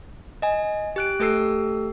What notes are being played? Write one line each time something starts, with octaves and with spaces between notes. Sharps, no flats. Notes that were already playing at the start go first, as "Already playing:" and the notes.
D#5 G#5
G4 F#6 D7
A3 G4 A4 E6 C7